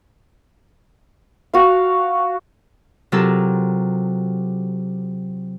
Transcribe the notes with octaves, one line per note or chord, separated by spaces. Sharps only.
F#4 F5
C3 F#3 F4 A4 A#4 E6